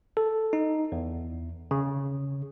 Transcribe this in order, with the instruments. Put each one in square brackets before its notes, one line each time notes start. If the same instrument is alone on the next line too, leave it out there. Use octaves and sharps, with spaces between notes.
[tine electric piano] A4
D#4
E2
C#3